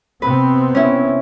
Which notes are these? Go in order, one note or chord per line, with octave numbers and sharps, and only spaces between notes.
C3 B3 C4 B4
C#4 E4